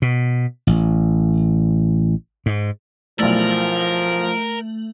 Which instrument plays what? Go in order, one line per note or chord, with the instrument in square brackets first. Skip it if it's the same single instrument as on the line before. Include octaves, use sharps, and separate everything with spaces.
[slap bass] B2
A1
G#2
[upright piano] B1 E4 D5 [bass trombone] F3 [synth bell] A3 F#7 [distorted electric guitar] A#4